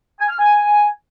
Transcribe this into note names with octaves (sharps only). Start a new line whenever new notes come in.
G#5
F6
G#5